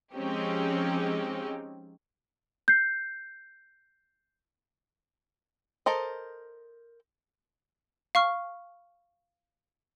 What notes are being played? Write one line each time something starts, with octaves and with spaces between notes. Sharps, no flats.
F3 G#3 C4 C#4 D#4 G4
G6 C7
A4 A#4 C5 D#5
F5 C#6 F6